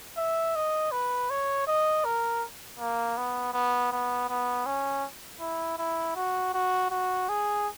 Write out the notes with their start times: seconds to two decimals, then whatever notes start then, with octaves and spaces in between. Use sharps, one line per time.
0.17 E5
0.55 D#5
0.92 B4
1.30 C#5
1.67 D#5
2.05 A#4
2.80 A#3
3.17 B3
3.54 B3
3.92 B3
4.29 B3
4.66 C#4
5.41 E4
5.78 E4
6.16 F#4
6.54 F#4
6.91 F#4
7.29 G#4